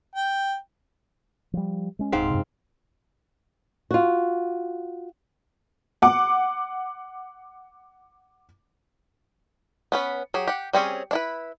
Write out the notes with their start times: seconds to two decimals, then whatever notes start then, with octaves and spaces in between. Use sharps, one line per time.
0.15 G5
1.53 F3 G3
1.99 G#3 C#4
2.12 D1 G#2 C4 F5
2.30 F#2 C3
3.91 F4 F#4
6.02 F#5 D6
9.92 B3 C#4 B4
10.34 F#3 G4 G#4
10.47 G4 F#5
10.73 G3 C4 C#4 G#4
11.11 D4 E4 B4